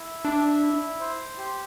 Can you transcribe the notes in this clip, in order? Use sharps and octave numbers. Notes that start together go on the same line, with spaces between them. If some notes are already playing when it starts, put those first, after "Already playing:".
Already playing: E4
D4 E5
E4
C5
G4